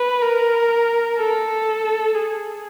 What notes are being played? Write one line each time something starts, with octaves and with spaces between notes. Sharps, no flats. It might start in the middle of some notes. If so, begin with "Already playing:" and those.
Already playing: B4
A#4
A4
G#4